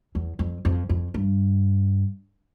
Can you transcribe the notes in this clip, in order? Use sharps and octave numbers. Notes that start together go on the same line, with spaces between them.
E2
F2
F2
F2
G2